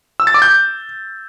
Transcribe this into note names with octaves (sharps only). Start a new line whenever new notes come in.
E6
A6
D6
G6